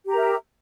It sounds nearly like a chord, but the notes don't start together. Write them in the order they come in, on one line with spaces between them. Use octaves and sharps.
G4 A#5 A#4 E5